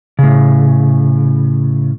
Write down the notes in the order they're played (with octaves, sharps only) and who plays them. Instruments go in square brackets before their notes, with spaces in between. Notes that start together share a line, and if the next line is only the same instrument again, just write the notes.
[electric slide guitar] A2 C#3